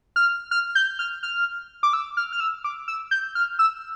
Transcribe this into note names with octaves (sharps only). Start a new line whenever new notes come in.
F6
F6
G6
F6
F6
D6
E6
F6
F6
E6
D6
E6
G6
F6
E6